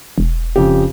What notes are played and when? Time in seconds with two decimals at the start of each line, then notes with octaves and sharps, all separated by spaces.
0.18 E1
0.56 F2 C#3 G4